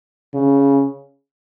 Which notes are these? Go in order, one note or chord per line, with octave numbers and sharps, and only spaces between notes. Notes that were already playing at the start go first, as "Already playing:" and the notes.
C#3